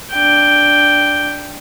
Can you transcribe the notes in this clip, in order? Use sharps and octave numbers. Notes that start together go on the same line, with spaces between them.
D4 G5